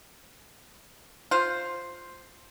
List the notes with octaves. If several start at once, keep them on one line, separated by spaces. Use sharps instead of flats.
F4 C5